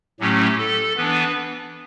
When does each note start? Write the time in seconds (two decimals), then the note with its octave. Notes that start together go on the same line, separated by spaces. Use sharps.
0.20 A2 F#3 A3 C#4 G4
0.58 A4
0.97 E3 B3 D4 B4